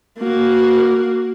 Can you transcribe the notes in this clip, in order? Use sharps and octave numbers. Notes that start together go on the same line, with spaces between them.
A#3 F#4